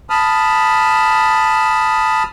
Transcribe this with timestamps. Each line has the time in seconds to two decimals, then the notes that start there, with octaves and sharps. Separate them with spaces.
0.10 A5 B5 D#6 F6